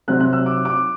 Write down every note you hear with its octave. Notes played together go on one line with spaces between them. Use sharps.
C3 F#3 C4 F#6
F#6
E6
D6
D6